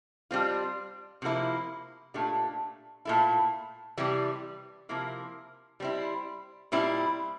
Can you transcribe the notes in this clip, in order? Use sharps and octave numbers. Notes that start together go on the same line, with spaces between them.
G3 C4 F4
C3 F3 A#3 E4
A#2 A3 D4 G4
A#2 A3 E4
C3 E3 G3
C3 F3 A#3 E4 A#4
G3 C4 E4
A#2 G3 C4 E4